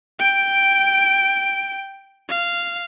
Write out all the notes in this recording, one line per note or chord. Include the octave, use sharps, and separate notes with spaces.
G5 D7
F5